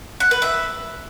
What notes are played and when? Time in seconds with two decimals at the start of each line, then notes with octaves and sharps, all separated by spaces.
0.20 F#5
0.31 B4
0.42 E5